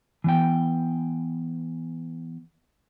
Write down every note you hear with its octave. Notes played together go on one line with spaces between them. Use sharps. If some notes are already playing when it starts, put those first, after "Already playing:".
E3 B3 G5